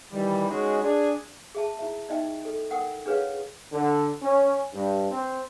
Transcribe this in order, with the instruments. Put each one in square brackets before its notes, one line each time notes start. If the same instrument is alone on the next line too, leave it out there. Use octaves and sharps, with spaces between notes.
[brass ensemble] D#3 E3 G3
G#3 C#4 D#4 F#4 G#4
D4 G#4
[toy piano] G#4 E5 A5
E4 E5
D#4 D#5 E5 G5
A4
A#4 F#5 G5 D#6
D4 G#4 B4 C#5 F5
[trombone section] D3
C#4
G2
C4